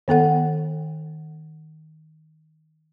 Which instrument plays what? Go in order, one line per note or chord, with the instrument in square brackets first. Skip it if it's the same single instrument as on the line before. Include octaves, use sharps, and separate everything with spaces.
[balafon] D#3 B3 A4 F#5